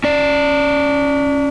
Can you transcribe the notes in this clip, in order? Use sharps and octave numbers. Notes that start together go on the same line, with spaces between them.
C#4 D5